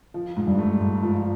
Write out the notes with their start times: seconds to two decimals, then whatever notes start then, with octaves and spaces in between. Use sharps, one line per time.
0.14 F3
0.37 G#2
0.47 G2
0.59 A3
0.81 G#2
1.03 F3